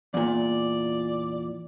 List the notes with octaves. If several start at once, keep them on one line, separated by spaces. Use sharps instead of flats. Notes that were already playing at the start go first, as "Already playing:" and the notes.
E2 A#2 D5